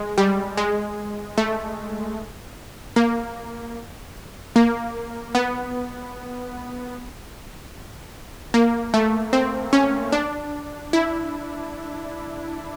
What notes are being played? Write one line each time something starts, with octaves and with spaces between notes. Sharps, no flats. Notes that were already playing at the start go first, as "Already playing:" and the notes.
Already playing: G#3
G3
G#3
A3
A#3
A#3
B3
A#3
A3
C4
C#4
D4
E4